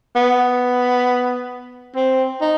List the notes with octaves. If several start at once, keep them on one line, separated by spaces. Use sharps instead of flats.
B3
C4
D#4